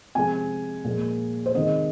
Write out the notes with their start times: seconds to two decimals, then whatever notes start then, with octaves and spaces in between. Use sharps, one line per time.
0.15 C3 F3 G#3 G#5
0.84 A#2 F3 G#3
1.46 C5
1.54 C3 D#3 G#3 D#5